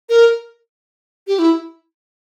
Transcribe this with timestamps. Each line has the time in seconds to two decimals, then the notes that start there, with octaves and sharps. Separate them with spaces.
0.09 A#4
1.28 G4
1.39 E4